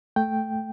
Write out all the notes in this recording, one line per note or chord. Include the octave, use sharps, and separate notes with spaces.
A3 G5